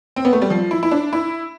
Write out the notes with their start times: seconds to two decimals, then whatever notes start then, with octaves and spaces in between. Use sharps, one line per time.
0.16 C4
0.25 B3
0.33 A3
0.42 G3
0.50 F3
0.71 E4
0.83 E4
0.91 D4
1.13 E4